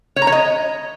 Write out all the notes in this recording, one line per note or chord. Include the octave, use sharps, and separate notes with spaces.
C#5
A#5
C#5
D#5